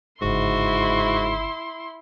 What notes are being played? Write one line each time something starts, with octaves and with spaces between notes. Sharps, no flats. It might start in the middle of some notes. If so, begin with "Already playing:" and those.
G1 G#2 C#3 E4 F#4 C6